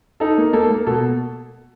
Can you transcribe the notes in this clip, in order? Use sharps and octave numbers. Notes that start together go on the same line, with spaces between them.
D#4 A4
A#3
A#3 A4
A#3
B2 A4